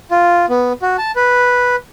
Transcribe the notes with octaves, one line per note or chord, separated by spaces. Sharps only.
F4
B3
F#4
A5
B4